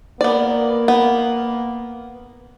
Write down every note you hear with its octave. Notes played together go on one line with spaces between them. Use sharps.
A#3 B3 D5
B3